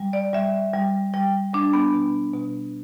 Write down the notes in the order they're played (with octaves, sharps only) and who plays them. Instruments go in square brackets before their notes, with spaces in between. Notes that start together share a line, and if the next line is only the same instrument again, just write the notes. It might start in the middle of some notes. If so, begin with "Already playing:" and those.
Already playing: [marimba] G3
D5
G3 E5
G3
G3 G5
G3 D4
B3
B2
B2